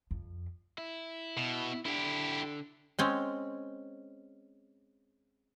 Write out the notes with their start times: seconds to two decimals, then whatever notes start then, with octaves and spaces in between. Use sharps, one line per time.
0.11 F2
0.78 E4
1.37 B2
1.85 D3 D4 E4 G4
2.99 G#3 C4 C#4